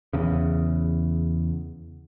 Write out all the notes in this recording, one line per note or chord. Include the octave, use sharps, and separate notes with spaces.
E2 C#3